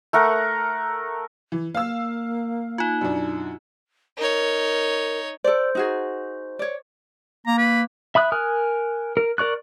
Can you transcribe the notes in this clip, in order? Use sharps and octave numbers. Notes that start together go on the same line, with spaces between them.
A3 A#4 F#5
E3
A#3 F5 E6
D#4 F4
F#2 B2 D4
D#4 A#4 C#5
A4 C5 D5
D#4 F#4 G#4
C#5 D5
A#3 A#5
B4
E5 B5 D#6 F#6
A#4 G#5 D#6 F6 F#6
A#4
A#4 D5 C#6 F#6